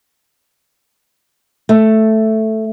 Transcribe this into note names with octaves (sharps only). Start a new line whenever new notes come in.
A3